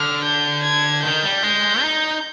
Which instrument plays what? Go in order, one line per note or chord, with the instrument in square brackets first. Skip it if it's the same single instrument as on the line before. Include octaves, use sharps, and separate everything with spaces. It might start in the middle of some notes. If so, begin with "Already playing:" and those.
Already playing: [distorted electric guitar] D3 [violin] F6
[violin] G6
G#6
[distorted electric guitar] D#3 [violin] G6
[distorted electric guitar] G3
G#3
D#4